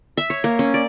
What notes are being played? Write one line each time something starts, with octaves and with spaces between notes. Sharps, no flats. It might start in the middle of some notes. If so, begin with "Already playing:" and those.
E5
C#5
A#3
C#4
D5